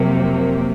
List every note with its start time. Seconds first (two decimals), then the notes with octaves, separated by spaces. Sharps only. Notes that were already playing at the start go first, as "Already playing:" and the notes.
Already playing: F2 C3 F#3 A#3